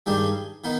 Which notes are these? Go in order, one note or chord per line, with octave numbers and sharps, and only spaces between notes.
G2 D#3 G3 D4 G#4
D#3 B3 D#4